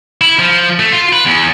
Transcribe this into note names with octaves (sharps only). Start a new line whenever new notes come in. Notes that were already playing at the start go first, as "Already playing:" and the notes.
E4
F3
A3
F4
B4
E2